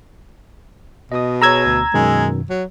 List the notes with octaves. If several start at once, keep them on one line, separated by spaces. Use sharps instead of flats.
B2 D#5 D#6
G#4 C#5 A#5 E6 G#6
D2
F#2 B2 D#3 G#3
F#3